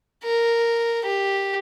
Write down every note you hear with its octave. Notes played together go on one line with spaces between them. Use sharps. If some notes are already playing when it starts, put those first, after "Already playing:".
A#4
G4